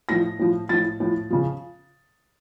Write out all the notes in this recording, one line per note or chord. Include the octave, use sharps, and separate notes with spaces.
A2 F3 A#6
A2 F3
A2 F3 A6
A2 F3
C#3 F3